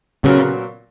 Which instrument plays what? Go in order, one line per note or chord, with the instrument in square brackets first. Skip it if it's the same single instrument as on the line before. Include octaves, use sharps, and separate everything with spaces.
[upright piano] A#2 F#3 B3 F#4 A#4 [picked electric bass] C#3